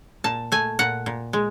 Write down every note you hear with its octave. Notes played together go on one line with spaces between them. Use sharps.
A#2 A5
A3 G#5
A#2 F#5
A#2
G#3